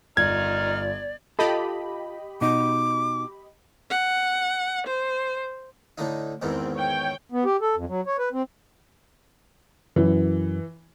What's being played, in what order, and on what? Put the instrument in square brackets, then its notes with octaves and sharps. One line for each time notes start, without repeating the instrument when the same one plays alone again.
[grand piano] G1 F4 [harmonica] D#4 F6 [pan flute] D5 [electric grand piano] G#6
[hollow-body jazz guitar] F4 A4 [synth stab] G4 D#5 B5
[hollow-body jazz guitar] B2 D#4 [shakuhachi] D6
[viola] F#5
C5
[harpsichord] A2 D3 D#4
[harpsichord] E2 G#2 D#3 [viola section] C4
[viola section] C#5 G5
[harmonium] B3
G4
A4
F2
F#3
C#5
B4
C4
[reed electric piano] F#2 [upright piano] E3